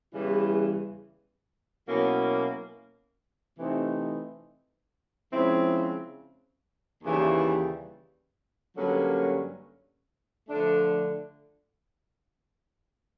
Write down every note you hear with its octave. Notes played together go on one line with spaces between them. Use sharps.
E2 C#3 E3 G3
B2 F#3 A#3 C#4 E4
C3 E3 A3 C4 D#4
C#3 F3 G#3 C4 E4
D#2 C#3 E3 G3
G2 D3 F#3 A#3 C#4
D3 F3 A3 D4